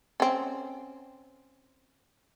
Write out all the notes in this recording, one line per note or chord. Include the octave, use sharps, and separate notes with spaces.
C4 C#4